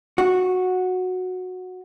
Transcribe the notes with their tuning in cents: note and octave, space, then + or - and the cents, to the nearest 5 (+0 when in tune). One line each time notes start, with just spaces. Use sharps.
F#4 -10